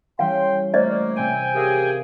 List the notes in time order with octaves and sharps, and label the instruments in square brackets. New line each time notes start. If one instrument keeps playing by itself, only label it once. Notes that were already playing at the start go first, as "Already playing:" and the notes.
[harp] E3 G3 C#4 [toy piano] F5 [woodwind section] G5 C6
[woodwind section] A3 A#3 [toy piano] C5 D5 D#5
[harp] C3 C4 [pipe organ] G5 G#5
[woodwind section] G4 G#4 [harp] A#4 E5 F5